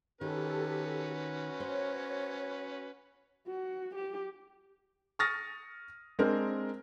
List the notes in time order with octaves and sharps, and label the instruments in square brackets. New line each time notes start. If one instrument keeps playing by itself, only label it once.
[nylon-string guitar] D#3 [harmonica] C#4 F#4 B4 [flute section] G4 A4
[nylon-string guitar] C5 [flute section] C#5
[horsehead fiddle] F#4
G4
[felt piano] C#6 D#6 F6 A6 A#6
G#3 C4 D4 A#4